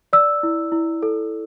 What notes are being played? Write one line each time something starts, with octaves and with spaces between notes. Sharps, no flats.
D5 E6
E4
E4
A4